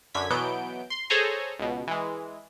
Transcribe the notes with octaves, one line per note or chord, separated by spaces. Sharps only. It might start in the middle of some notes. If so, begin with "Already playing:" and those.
F#2 D3 G#6 B6
B2 E3 F#3 B3 G6 D7
C6
G#4 A4 C5 C#5 G#5 A#5
C#2 B2
E3 G#3